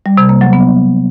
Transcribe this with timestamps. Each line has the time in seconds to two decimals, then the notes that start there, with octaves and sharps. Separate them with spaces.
0.06 G3
0.17 C3
0.29 A#3
0.41 F#3
0.53 B3